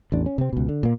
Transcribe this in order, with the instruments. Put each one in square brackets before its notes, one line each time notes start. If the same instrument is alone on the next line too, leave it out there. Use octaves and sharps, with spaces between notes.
[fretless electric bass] A1 E2 D4
C#4
C3 C4
C#2 B2
D3
A#2 A#3